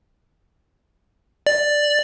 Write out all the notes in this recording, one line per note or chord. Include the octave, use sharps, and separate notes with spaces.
D5